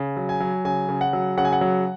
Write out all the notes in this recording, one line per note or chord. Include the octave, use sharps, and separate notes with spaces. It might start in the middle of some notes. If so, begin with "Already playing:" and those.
Already playing: C#3
F#3
G#5
F#3
C#3 G#5
C#3
F#5
F#3
C#3 F#5
G#5
F#5
F#3